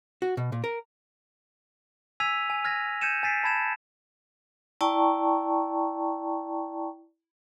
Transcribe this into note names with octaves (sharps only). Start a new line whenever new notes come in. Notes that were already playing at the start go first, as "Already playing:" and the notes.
F#4
B2
A#2
A#4
G#5 E6 G#6 B6 D#7 F7
G#5
F6 G#6 A#6
G6 G#6 C#7 D#7 E7
G#5 A6 B6 C7 D7
G#5 A5 B5 G#6 E7
E4 D5 G5 A5 A#5 C#6